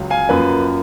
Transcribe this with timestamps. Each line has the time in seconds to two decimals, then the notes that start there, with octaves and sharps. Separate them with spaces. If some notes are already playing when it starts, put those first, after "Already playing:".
Already playing: C#2 C#3 F#3
0.10 F5 G#5
0.29 F#2 F3 A#3 B4